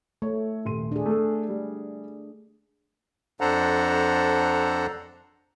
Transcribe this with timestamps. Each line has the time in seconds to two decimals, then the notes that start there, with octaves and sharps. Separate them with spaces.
0.22 A3 C#5
0.65 D#1 C6 D#7
0.92 D4 G#4
1.06 A3 A4
1.49 G3
3.41 F2 D4 A4 C5 F#5 A#5